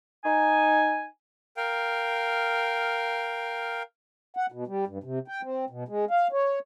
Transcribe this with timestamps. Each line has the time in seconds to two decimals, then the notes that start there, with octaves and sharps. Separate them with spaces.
0.25 D#4 G#5
1.57 A#4 F5 G5
4.37 F#5
4.52 B2
4.67 G3
4.87 G2
5.04 C3
5.28 G5
5.43 C4
5.70 B2
5.88 G#3
6.11 F5
6.32 C#5